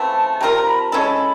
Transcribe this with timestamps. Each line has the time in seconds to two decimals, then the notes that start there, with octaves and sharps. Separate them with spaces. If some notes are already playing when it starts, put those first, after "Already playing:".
Already playing: C#3 E3 A3 C4 A5
0.41 G3 C4 F4 A#4 A#5
0.53 A#5
0.67 B5
0.80 A5
0.92 G#3 C#4 E4 A4 B5